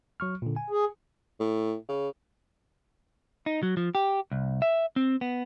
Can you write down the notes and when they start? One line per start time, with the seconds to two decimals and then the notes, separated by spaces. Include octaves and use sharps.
0.20 F#3 C#6 F6
0.42 A#2 D3
0.56 G#5
0.70 G#4
1.39 A2
1.89 C#3
3.46 D#4
3.63 F#3
3.77 F3
3.95 G4
4.31 C2
4.62 E5
4.96 C4
5.21 B3